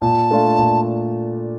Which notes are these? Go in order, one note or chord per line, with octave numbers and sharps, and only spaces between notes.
A#2 A5
A3 D4 F4 A4
A#2